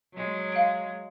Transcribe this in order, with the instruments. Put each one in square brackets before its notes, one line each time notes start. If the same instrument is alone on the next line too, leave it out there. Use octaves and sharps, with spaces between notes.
[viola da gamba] F#3 G#3
[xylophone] F5 D7